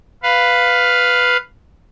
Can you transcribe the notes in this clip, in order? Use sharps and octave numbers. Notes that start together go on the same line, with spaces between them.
B4 F5